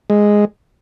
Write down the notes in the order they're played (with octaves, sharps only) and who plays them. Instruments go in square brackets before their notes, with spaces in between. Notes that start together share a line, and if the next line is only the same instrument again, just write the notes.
[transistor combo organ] G#3